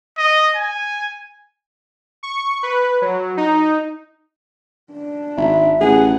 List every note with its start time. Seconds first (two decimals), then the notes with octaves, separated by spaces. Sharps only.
0.18 D#5
0.56 G#5
2.23 C#6
2.63 B4
3.02 F#3
3.37 D#4
4.92 D4
5.37 G#1 E5
5.80 A1 G#4 F#5 G#5